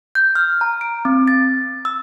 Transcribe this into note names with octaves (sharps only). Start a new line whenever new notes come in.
G6
F6
A#5
D7
C4
A6
E6